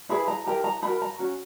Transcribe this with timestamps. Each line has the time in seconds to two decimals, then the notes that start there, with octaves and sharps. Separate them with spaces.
0.09 E4 G#4 B4 B5
0.28 A#5
0.46 E4 G4 A#4 A#5
0.64 A#5
0.82 D#4 F#4 A#4 B5
1.02 A#5
1.19 C#4 F#4